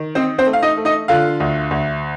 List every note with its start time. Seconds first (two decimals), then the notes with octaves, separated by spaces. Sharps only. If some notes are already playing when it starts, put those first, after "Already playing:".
Already playing: D#3
0.15 C4 D#4 C5
0.38 C4 C5
0.46 A3
0.53 F5
0.62 D#4 D#5
0.77 A3
0.85 D#4 D#5
1.08 D3 F4 F5
1.40 D2
1.71 D2